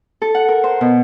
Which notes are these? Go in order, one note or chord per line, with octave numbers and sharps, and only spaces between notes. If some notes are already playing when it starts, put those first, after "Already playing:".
A4
F#5
A#4
C5
B2